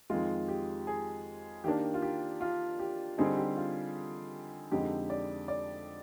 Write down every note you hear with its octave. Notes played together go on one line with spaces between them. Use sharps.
F2 D#3 G#3 F4
G4
G#4
D#3 A#3 D4 G4
F4
G4
F4
G4
D3 G3 C4 D#4 G#4
G4
F4
F2 D3 G#3 D#4 G4
D5
D5